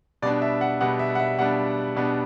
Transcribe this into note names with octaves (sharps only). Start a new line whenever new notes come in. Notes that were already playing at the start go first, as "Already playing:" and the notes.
B2 G3 B3 D4 D5
E5
F#5
B2 G3 B3 D4 F#5
E5
F#5
E5
B2 G3 B3 D4 F#5
B2 G3 B3 D4